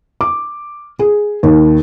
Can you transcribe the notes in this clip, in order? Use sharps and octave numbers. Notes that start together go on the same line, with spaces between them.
D6
G#4
D#2